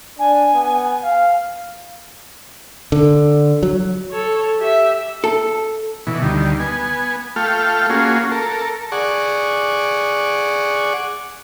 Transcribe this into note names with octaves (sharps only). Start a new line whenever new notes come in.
D4 G#5
B3
F5
D3
F#3
A4 C#5
G4 E5
A4
B2 E3
D2 D#3 G3
B3 G#5
A3 F4 A4 G5 F6
A#3 C#4 F4 F#4 G#4
A4 A#4
G#4 D5 F#5 C#6